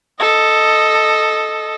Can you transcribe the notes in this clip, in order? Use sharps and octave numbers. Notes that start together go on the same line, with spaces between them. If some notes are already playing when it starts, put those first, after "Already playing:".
A4 D#5